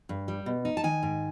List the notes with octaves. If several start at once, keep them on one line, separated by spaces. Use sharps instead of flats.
G2
G3
B2
D#4
A5
D#3 G#5
G#2